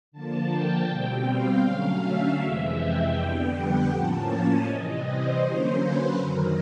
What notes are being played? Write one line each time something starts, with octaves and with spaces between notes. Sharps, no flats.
D3 F3 A#3 A5
G5
B2 G3 C4
F5
D3 F#3 A3 C#4
E5
F2 C3 E3 G#3
G5
F2 D3 G3 B3
F#5
A2 F3 A#3 C#4 A5
G#5
C3 E3 G3 D#5
C5
D3 F#3 A#3 C#4
B4
F#2 D#3 F#3 A#4